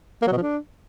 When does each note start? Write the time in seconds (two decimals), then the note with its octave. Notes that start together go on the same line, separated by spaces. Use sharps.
0.22 A#3
0.27 F#3
0.32 B2
0.37 F3
0.42 D4